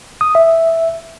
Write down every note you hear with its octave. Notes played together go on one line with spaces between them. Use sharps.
D#6
E5